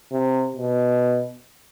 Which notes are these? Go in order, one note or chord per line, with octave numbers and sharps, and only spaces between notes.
C3
B2